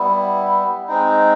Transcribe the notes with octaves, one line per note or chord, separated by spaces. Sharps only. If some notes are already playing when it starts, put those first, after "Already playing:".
Already playing: G3 B3 E4
G#3 C4 D#4